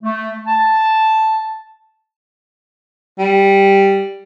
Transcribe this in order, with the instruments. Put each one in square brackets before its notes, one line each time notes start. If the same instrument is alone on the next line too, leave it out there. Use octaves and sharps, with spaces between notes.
[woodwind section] A3
A5
[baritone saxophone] G3